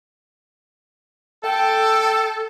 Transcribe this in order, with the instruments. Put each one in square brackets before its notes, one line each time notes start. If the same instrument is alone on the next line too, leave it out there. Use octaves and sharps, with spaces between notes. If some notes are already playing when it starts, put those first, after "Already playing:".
[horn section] A4 [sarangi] G5